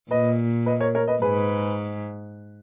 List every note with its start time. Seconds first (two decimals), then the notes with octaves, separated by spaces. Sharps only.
0.11 A#2 B4 D#5
0.66 B4 D#5
0.80 A#4 C#5
0.95 A#4 C#5
1.08 B4 D#5
1.22 G#2 G#4 B4